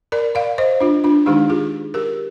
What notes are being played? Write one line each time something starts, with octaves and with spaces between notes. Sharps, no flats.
A#4 D5
D5 F5
C5 D#5
D4 F4
D4 F4
D#3 G#3 D4 D#4 G4
F4 G#4
G4 A#4